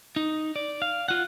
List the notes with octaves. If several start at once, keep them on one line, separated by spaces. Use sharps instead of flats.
D#4
D5
F5
F4 F#5